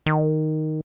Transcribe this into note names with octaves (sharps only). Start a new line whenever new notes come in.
D#3